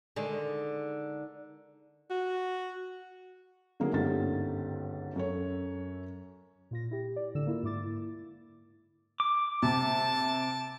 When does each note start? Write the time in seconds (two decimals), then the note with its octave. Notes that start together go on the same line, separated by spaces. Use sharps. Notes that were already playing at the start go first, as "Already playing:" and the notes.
0.16 D3 D#3 G#3
2.10 F#4
3.80 D3 D#3 F#3 A#3 G#4
3.93 G1 C#2 G#2 D3 G4 A6
5.16 F#2 A4 C#5
6.71 A#2 F4 A#6
6.91 E4 G4
7.16 D5
7.34 A2 D3 E6 E7
7.47 A#3 E4 F4
7.63 G#2 E4 D6 A6
9.20 D6
9.62 C3 A5